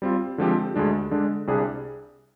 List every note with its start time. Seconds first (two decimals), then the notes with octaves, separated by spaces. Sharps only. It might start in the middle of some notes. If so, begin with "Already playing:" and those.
0.02 G3 C4 F4
0.38 D3 F3 G#3 C4 G4
0.74 D2 D3 G#3 D4 G4
1.11 D3 G#3 D4
1.47 C2 C3 G3 D4 G#4